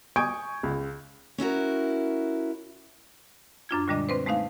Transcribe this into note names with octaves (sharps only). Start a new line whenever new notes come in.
G#5 C#6 D#6 G6 G#6 D7
C#2
C#4 E4 F#4 A#4
F#2 D4 F4 G#6
A#2 D3 G3 G#3 D4 D#5
C4 B4 C5
G#3 A3 C4 D#4 F5